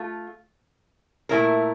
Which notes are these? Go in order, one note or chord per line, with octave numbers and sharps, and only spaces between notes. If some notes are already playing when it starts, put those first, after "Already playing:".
Already playing: A3 F4
A#2 A3 E4 A#4